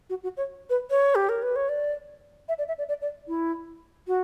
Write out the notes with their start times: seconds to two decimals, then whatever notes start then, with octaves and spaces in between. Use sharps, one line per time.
0.10 F#4
0.23 F#4
0.37 C#5
0.70 B4
0.90 C#5
1.15 G4
1.29 A#4
1.43 B4
1.56 C#5
1.69 D5
2.49 E5
2.58 D5
2.68 E5
2.78 D5
2.89 D5
3.01 D5
3.28 E4
4.07 F#4